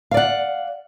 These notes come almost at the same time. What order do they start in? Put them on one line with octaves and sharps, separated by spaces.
F5 D5 F#5